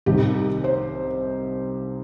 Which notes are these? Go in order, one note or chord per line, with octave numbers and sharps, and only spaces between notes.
C2 C3 D#3 G4
C5